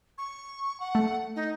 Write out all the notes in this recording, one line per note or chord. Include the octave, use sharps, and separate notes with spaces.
C#6
F#5
A3
D#4